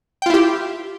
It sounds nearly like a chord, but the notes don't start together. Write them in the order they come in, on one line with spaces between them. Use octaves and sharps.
G5 F4 E4 G4